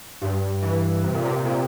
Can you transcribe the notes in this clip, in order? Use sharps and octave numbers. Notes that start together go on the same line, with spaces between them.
G2
E3
C3
A#2
C3
A#2